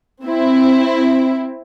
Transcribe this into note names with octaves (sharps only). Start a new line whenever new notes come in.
C4 E4